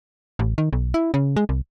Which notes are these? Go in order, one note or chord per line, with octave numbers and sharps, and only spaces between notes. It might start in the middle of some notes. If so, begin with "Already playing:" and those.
A1
D#3
B1
E4
C#3
G#3
C2